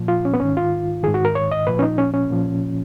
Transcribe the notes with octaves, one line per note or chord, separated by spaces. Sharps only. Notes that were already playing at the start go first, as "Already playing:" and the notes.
Already playing: A#2 F3
F4
C#4
B3
G#2 D#3 C#4
F4
G#2 D#3 G#4
F#4
A#4
C#5
D#5
A#2 F3 B4
C#4
D#4
C#4
C#4
A#2 F3